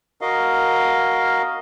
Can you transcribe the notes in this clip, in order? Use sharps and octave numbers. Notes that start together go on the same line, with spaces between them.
F#4 A#4 D#5 F5